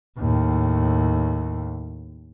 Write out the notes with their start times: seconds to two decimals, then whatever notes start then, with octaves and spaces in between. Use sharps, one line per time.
0.18 D#2 A2